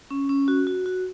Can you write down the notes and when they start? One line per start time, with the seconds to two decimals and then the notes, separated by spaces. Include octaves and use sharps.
0.11 C#4
0.29 C#4
0.48 F#4
0.67 F#4
0.86 F#4